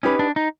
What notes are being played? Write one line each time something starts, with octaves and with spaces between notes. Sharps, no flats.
C#4 D#4 G4 B4
D4
D#4